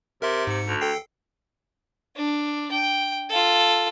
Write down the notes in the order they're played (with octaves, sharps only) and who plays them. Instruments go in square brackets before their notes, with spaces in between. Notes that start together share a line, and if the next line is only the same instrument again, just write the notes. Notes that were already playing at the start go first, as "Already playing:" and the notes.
[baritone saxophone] C3 [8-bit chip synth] A#4 E5 C6
[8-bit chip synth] G#2 C#7
[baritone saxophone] D2
[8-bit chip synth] A4 G5 C7
[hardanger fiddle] D4
G5
F4 A4